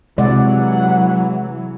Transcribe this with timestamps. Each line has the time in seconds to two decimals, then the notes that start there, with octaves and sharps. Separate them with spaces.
0.18 C3 E3 F#3 G#3 D5 F#5